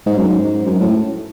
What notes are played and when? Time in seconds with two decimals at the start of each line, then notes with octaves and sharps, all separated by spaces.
0.06 G#2
0.17 F#2
0.28 G#2
0.65 F#2
0.80 A2